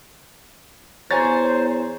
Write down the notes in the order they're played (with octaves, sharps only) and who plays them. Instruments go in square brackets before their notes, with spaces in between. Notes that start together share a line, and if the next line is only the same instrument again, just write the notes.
[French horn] E2 [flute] C5 [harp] C#5 [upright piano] G#5 A#5 A6